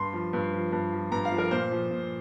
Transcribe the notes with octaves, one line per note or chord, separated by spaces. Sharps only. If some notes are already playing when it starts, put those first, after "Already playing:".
Already playing: G2 C6
F3
G2
F3
G2
F3
G2 A#5
F5
F3
A#4
A#2 C5
F3
A#2